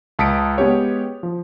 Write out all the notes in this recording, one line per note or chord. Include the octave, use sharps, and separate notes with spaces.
C#2 A5 D#6 B6 C#7 D7
G#3 B3 C#4 G4 C#5
F3